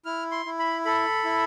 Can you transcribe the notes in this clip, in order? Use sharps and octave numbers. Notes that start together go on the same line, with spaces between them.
E4 F6
C6
E4
B5
A4 B5
E4